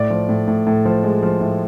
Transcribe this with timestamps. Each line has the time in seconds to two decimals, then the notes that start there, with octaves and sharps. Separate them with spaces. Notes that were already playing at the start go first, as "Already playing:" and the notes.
Already playing: A2 D5
0.10 F3
0.29 A2
0.48 A2
0.67 A2
0.85 F3
1.04 G#3
1.23 F3
1.41 A2